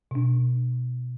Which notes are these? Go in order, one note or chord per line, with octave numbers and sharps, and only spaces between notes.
B2 D4